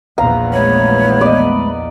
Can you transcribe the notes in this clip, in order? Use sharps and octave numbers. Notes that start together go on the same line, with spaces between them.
A#1 E2 B3 F5 A#5
G#3 A3 C#5 B5
D5 D#5